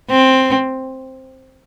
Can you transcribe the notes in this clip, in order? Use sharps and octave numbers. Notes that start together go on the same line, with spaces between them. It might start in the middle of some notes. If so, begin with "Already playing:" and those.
C4